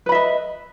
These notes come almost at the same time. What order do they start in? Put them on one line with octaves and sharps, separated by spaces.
B4 B5 E5 D#5